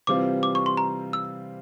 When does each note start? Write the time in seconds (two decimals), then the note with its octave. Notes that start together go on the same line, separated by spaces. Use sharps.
0.07 C3 E3 G3 C4 F4 D6
0.43 D6
0.55 C#6
0.66 C6
0.77 A#5
1.13 E6